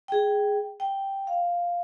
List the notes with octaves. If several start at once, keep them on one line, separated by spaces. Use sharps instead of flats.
G#4 G5
G5
F5